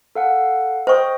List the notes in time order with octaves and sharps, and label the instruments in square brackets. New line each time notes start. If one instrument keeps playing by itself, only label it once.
[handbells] A4 F5 F#5
[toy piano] C5 C#6 [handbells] D#5 G5 D#6